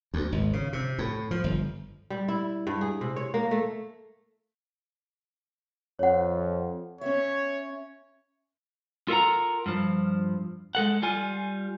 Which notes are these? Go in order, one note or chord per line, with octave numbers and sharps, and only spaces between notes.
D2
G#1
C#3
C3
A2
F3
G1
G3
E4
G2
G#4
C3
C#5
A#3
A3
F2 C#5 F#5
C#4 C#5 E5
F4 A4 A#4 F5 F#5 A#5
G2 F3
G#3 A4 F#5
G3 F4 G#5